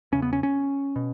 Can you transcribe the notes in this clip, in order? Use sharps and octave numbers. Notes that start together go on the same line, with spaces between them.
E2 C#3 C#4
B3
C#4
C#4
B2